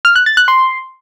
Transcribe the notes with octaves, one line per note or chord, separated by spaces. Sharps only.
F6
F#6
A6
F#6
C6